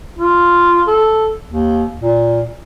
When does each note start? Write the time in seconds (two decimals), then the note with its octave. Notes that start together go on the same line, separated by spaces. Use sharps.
0.19 F4
0.87 A4
1.48 D#2
2.01 A#2